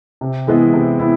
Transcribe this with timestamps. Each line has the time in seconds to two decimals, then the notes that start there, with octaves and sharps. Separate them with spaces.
0.21 C3
0.47 E3 G#3 B3 E4
0.73 C3
0.99 B3 E4